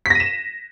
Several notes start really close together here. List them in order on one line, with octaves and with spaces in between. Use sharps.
B6 A#6 D#7 E7